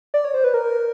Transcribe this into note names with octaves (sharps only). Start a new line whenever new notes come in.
D5
C#5
C5
B4
A#4